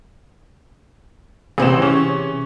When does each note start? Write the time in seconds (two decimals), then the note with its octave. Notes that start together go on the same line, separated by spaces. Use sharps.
1.58 A1 C3 C4 G#4 E7
1.78 E3 C#4